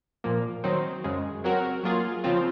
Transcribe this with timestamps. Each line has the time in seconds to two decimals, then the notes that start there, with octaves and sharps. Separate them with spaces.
0.24 A#2 F3 A#3
0.64 D#3 F#3 C4 D#4
1.04 F#2 C#3 G#3
1.44 F#3 C4 F#4 A#4
1.83 F#3 A#3 F4 G#4
2.24 C#3 F3 C4 F4